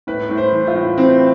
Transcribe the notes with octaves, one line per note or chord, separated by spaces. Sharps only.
A2 B4
A2
C5
E3
F4
A2
E3 C4